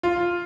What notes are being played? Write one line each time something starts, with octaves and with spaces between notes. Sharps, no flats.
F4